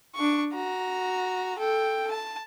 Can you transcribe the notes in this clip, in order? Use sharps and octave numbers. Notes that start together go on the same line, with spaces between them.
D4 C#6
F#4 A#5
A4 G5
A5